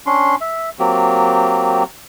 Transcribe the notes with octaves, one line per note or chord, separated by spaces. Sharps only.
C#4 D4 C6
E5
F#3 A#3 C4 G4